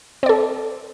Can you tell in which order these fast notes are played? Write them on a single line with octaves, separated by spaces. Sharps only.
C4 D5 A4